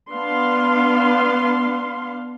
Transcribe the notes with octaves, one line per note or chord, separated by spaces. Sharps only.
B3 D4 F5 C6